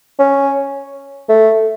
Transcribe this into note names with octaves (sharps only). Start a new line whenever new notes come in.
C#4
A3